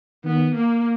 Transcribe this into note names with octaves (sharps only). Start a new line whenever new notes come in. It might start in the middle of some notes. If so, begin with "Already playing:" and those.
D#3 B3
A#3